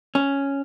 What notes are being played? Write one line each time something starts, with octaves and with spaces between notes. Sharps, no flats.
C#4